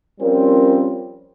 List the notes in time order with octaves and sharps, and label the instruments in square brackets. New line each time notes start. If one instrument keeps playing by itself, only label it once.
[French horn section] F3 G3 C4 C#4 F4 A#4